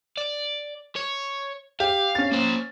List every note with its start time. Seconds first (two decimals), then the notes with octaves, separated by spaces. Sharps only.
0.17 D5
0.96 C#5
1.80 G4 F5
2.15 C#4 A6
2.32 A#3 C5